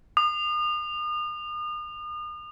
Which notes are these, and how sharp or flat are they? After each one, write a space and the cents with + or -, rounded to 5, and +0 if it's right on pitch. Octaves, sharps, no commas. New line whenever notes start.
D#6 -40